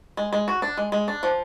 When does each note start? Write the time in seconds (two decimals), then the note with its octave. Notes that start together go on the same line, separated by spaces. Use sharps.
0.17 G#3
0.32 G#3
0.48 F#4
0.62 D4
0.77 G#3
0.92 G#3
1.08 D4
1.23 F3